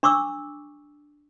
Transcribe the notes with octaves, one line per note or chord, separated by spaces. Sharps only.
D4 C#6 D6 E6